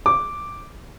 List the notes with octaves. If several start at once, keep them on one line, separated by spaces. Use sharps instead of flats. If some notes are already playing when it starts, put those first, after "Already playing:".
D6